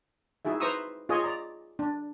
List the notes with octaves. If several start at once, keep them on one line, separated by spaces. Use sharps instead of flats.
D#4 E4 F#4 G#4 E5
B4 C5 A#5 C#6 D#6 E6
F4 G#4 C#5 D#5
D5 A#5
D4